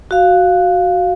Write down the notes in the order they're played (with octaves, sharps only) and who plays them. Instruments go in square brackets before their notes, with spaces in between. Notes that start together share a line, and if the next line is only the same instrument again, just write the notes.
[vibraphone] F#4 F5